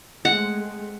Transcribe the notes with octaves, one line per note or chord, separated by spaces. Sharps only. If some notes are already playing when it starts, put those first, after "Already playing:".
G#3 A3 C4 F#5